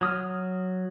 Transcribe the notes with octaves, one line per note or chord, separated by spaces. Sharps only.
F#3 D#6 F6